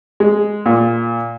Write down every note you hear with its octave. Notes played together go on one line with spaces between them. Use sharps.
G#3
A#2